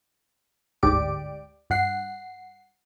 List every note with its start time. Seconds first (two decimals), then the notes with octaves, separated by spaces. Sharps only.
0.83 G1 D2 G#2 G4 D5 D7
1.70 G2 F#5 C7